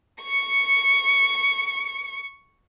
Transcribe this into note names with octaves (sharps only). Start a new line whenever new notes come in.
C#6 C#7